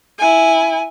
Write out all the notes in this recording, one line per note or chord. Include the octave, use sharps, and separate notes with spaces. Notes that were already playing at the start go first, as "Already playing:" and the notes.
E4 G#5